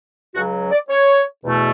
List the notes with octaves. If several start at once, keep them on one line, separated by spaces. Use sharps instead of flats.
C#2 C#3 F#3 F#4
D5
C#5
E2 B2 A3